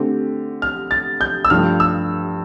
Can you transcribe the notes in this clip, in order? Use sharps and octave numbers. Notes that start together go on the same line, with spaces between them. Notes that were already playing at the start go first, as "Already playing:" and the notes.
Already playing: D3 A3 C4 G4
F6
A6
G6
E6
G2 F3 A3 F6
E6